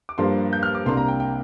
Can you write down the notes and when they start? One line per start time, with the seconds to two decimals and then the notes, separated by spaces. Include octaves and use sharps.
0.09 D6
0.18 G2 F3 A#3 D4 C6
0.53 G6
0.63 F6
0.75 D6
0.86 C2 C3 A#3 D4 C6
0.97 A#5
1.08 G5
1.20 G5